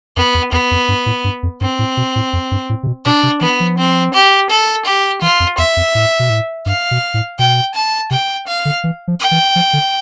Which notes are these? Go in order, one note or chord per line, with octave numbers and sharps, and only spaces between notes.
F2 B3
E2
E2 B3
F2
G2
A2
G2
F2
G2 C4
A2
B2
A2
F2
G2
A2
C3
B2
B2 D4
C3
E3 B3
F3
C4
G4
A4
G4
E3 F4
F2
E2 E5
F2
A2
B2
A2
G2 F5
B2
A2
B2 G5
A5
C3 G5
F5
D3
E3
F3
G5
E3
F3
D3